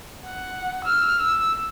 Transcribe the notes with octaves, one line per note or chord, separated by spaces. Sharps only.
F#5
E6 F6
E6